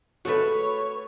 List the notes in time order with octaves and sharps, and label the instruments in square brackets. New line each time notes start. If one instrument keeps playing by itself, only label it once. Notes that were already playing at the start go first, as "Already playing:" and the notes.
[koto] G#3 A3 [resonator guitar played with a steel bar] F#4 A4 B4 [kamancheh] C#5